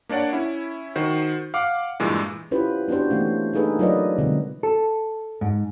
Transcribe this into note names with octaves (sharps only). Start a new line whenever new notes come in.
A#3 D4 C#5 D5 F#5
C#4 E4
D#3 F#4 C5
F5 F#5 D6
G2 A#2 E3 G#3
C#4 E4 F4 G4 B4 C5
B3 D4 F#4 G4 C5
E3 A3 A#3 C#4
A#3 D4 D#4 G#4 A4 B4
F#3 F4 A#4 B4 D5 D#5
B2 D3 G#3 C4
A4
G#2